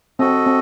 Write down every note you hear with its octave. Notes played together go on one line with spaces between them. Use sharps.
C4 F#4 A4 D#5
C4